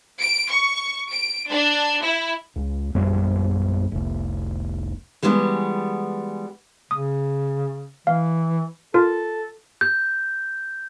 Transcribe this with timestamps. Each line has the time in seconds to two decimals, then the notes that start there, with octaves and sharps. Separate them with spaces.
0.20 D7
0.50 C#6
1.12 D7
1.50 D4
2.03 E4
2.56 C#2
2.95 A#1 F#2 G3 C4
3.92 F1 C2
5.22 E3 G3 G#3 B3 F#4
6.91 C#3 D#6
8.07 E3 F5
8.94 F4 A4 A#4
9.81 G6